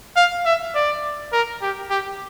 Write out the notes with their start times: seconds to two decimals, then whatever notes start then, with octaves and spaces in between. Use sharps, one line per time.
0.16 F5
0.45 E5
0.75 D5
1.33 A#4
1.62 G4
1.90 G4